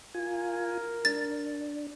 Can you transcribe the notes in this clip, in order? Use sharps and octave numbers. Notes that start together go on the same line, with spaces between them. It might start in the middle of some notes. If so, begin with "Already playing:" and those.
F4 A#4 G#5
D4 A6